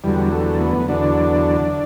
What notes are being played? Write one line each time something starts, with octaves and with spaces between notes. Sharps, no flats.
E2 D3 F#3 G3
A3
B3
E2 D3 F#3 D4